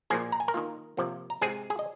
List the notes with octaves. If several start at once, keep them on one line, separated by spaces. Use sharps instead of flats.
A#2 F3 A#3 G#4 G#5
A#5
G#5
A#4 A#5
D#3 A#3 F4
C3 F3 A#3
A#5
C3 G#3 C4 G#4 G#5
G#4 G#5
D#5